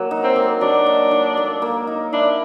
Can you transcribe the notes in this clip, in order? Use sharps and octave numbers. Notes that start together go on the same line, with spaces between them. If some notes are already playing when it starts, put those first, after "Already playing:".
Already playing: F#3 A#3
D#4
C4
A#3
F#3 D4
D#4
D#4
A#3
A#3
D#4
D4 E4